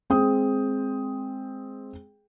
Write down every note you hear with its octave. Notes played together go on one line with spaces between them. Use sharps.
G#3 C4 G#4 G5 D#6